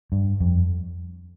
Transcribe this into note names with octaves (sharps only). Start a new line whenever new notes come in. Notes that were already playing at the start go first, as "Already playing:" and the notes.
G2
F2